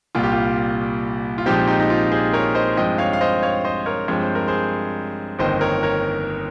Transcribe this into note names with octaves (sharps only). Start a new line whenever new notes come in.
C2 A#2 G3 F4
G4
F4
F4
A#1 A#2 F3 G#3 C4 D#4 G4
D#4 G4
D#4
F4
G#4 C5
A#4 C#5
C5 D#5
G2 F3 G#3 C4 D#5 G5
C#5 F5
F5
C5 D#5
C#5 F5
C5 D#5
A#4 C#5
G2 F3 G#3 C4 C#5
C5
A#4
G#4 C5
G1 F2 D#3 A#3 C5 D#5
A#4 C#5
A#4 C#5